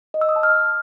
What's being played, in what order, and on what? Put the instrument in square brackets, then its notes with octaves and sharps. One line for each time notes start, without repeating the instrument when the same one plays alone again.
[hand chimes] D#5
E6
D#6
A5
F6